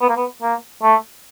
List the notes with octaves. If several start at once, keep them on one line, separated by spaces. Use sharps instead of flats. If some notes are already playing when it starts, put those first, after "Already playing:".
B3
A#3
B3
A#3
A3